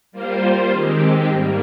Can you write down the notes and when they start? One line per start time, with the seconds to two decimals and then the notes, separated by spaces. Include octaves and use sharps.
0.12 G3 A#3 F4 C5
0.70 D#3 G#3 C4 G4
1.29 G#2 G3 A#3